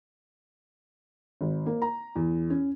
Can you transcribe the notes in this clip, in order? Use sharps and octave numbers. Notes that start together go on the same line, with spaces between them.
G#1
A#3
A#5
E2
C#4